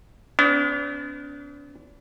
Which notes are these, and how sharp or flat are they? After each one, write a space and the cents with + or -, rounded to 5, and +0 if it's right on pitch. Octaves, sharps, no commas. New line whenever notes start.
B3 +40 D4 -40